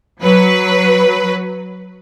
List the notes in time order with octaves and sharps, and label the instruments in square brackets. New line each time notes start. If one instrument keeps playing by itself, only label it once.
[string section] F#3 B4